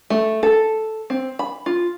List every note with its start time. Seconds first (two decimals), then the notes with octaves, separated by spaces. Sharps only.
0.10 A3
0.43 A4
1.10 C4
1.39 B5
1.66 F4